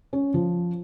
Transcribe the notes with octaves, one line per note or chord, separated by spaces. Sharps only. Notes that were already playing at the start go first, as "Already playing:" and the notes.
C#4
F3